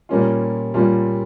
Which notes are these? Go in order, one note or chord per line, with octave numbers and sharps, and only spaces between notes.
A#2 G3 A#3 C#4 F4
A#2 G3 A#3 C#4 F4